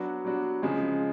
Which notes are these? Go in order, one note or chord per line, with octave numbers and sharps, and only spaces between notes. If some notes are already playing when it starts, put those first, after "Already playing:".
Already playing: F#3 B3 D4 F#4
F#3 B3 D4 F#4
C#3 F3 G#3